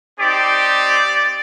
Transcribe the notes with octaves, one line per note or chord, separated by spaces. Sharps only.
C4 D#4 G4 D5